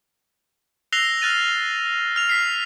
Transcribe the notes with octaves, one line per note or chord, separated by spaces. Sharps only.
E6 F#6 A#6 C7 F7 G7
F6 F#6 A6 D#7
F6 F7
B6 C7